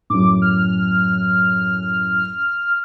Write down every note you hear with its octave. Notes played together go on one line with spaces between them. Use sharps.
F#2 A2 D6
F6